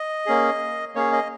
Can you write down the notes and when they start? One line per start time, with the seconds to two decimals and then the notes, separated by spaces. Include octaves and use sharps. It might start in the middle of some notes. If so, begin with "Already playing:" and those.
Already playing: D#5
0.26 A#3 C#4 G#4
0.95 A#3 C#4 G#4 C#5
1.12 D#5